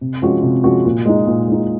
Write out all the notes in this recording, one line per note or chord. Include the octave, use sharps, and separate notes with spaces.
C3
F3 G#3 C#4 F#4
C3
F3 G#3 C#4 F#4
A#2
G#3 D#4
A#2
G#3 D#4